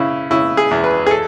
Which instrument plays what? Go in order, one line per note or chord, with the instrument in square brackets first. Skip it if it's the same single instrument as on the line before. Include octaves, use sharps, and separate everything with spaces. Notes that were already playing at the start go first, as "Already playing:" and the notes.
Already playing: [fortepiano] C#3 E4
C#3 E4
G#4
E2
B4
G#4
A4